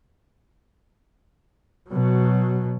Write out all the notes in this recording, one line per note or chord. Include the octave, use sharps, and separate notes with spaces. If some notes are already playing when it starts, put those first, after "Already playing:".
B2 F#3